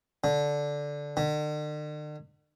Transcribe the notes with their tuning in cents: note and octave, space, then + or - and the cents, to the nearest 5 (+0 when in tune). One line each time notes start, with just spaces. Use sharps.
D3 -10
D3 +45